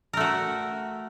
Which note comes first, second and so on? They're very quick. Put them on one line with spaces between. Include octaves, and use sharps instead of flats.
A#4 A3 F#4